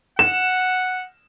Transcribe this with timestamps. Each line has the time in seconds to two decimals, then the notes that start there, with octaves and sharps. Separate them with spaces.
0.19 F#5 E7